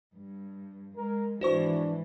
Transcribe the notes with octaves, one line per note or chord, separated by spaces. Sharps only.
G2
G#3 A#4
G#2 E3 D4 F#4 C5 C#6